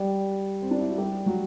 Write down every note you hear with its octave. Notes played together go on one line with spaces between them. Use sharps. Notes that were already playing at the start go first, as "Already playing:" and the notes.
Already playing: G3 G4
C4
D4
E4
F#4
G3 G4
F#3 F#4